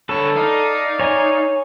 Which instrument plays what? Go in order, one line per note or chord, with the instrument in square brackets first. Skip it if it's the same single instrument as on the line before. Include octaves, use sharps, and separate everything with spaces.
[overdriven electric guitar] D3 B4 [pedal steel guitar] A4 [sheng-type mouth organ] C#5 A5 C#6
[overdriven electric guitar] D#4 [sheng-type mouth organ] D5 F5
[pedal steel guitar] C#5 G#5